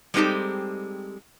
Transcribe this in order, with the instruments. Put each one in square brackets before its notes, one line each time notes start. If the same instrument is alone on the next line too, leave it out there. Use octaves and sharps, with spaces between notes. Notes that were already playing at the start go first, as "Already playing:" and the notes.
[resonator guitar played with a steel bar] G3 G#3 C4 D#4 G4 A4